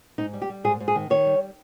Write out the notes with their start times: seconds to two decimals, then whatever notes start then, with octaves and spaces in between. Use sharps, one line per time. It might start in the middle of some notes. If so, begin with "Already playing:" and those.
0.18 G#2 D#4
0.33 G3
0.42 G4
0.50 G3
0.64 G#2 G#4
0.80 G#2
0.88 G#4
0.96 D#3
1.10 D#3 C#5
1.26 G3